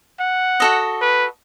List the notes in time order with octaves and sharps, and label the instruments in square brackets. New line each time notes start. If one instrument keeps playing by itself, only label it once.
[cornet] F#5
[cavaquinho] F#4 A4 D#5
[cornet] B4